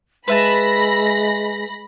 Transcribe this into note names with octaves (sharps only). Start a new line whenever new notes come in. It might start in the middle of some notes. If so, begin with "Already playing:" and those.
G#3 B4 E5 A5 B5 A#6